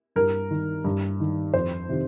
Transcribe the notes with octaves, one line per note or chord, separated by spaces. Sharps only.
G2 A#4
D#3
G2
D#3
F2 C5
C3 D#3